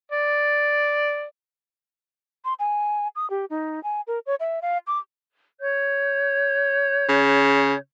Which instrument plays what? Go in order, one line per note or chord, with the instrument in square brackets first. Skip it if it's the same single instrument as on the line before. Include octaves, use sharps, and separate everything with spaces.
[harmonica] D5
[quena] C6
G#5
D#6
G4
D#4
G#5
A#4
C#5
E5
F5
D6
[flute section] C#5 G6
[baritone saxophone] C#3